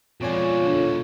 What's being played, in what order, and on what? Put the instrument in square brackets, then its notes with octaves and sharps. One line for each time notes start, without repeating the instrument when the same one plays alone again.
[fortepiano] F2 D5 G#5 [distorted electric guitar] B2 G#3 [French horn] F4 [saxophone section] C#5
[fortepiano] D3